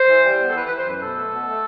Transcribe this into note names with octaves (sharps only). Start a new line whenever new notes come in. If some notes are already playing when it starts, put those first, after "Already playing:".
Already playing: C5
E3
G3
B3
A4
E3 B4
B4
E3
C5
F#2 B4
B2 A4
A3
B2
A3